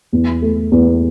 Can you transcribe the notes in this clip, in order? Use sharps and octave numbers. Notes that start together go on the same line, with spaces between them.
E2
A3
E2